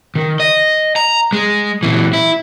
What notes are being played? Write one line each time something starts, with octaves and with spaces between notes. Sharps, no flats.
D#3
D#5
A#5
G#3
A#2 E3
E4